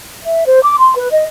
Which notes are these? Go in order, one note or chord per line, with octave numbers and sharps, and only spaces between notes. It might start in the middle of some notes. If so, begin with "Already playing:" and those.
E5
C5
D6
C6
B4
D#5